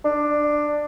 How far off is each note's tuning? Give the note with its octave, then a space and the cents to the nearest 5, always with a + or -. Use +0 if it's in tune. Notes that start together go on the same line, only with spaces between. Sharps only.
D4 +10